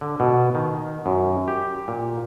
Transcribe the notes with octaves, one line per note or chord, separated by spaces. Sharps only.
D3
B2
D#3
F#2
G4
A#2